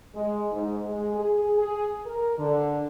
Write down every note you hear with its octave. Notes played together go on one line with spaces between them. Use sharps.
G#3
G#2
G#3
G#4
G#4
A#4
D3